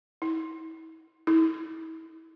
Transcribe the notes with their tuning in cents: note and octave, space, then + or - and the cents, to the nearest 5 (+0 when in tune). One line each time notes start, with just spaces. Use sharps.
E4 -40
E4 -35